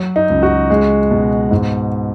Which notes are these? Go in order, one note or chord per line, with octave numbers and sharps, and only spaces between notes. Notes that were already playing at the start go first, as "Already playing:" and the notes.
Already playing: F#3
D#4
C#2
F#4
G#3
B2
G#2